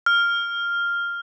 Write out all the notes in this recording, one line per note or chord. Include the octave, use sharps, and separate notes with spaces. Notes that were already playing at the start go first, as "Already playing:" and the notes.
F6